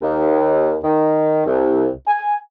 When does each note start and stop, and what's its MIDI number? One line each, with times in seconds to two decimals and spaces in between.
0.02 0.77 39
0.84 1.44 51
1.46 1.89 36
2.07 2.35 80